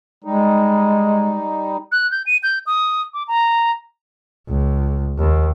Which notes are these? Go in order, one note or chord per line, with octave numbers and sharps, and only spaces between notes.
G3 G#3 D#4
F#6
G6
D#7
G6
D#6
D6
A#5
C#2
D#2